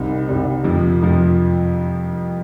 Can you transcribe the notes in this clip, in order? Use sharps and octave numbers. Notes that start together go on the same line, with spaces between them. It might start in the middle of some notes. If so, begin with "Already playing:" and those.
Already playing: C2 C3 G3 C4 D#4
C2 C3 G3 C4 D#4
F2 C3 F3
F2 C3 F3